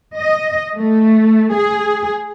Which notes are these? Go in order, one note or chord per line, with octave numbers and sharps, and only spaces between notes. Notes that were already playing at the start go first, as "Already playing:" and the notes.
D#5
A3
G#4